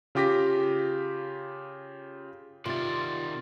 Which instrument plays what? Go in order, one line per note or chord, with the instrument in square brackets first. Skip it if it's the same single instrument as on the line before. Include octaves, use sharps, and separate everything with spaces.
[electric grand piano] C#3 F4 G4 D6 A#6 B6
[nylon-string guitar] C3 [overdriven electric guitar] D#3 D5 [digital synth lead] F4 [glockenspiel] C6 A6